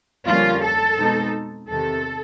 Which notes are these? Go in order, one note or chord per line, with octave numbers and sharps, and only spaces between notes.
F2 D3 G3 A#3 C#4 F4
A4
B2 G#3 C4 D#4
E2 C3 D#3 A4